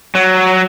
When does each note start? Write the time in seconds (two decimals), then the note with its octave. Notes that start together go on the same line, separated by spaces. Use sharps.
0.15 F#3